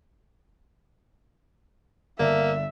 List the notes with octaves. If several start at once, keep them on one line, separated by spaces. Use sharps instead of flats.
G1 D3 A#3 D4 E5